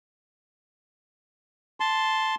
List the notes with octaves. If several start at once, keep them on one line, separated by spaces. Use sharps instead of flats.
A5 C6